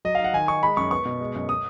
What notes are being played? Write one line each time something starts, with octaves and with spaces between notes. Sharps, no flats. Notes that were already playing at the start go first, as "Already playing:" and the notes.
F#3 D#5
F5
D#4
F#5
D#3 G#5
D#4 C#6
G#3 B5
F#2 C#6
B3 C#6
B2
G#3
F#2
D#6